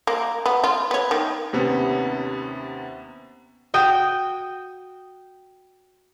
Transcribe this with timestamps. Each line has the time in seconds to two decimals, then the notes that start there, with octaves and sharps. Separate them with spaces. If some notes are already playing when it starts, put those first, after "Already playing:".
0.07 A#3
0.46 B3
0.64 F4
0.91 B3 C#5
1.11 D#3
1.53 D#2 C3 B3 C#4
3.74 F#4 G5 D#6